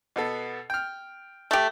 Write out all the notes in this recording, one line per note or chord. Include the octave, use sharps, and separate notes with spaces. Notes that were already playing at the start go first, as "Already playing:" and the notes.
B2 B3 A4
G5 F6
A3 G4